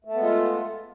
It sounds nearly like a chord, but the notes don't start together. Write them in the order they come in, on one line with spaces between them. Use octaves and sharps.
A3 A4 B3 G#3 F4